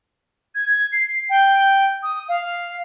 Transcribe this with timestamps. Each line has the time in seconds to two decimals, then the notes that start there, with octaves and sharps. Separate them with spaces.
0.54 G#6
0.92 C7
1.29 G5
2.03 D#6
2.28 F5